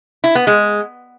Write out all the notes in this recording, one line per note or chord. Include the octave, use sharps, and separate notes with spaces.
E4
B3
G#3